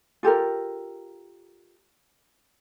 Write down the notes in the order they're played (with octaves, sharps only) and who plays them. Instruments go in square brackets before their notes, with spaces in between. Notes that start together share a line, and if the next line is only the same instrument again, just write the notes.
[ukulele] F4 G4 A4 A#4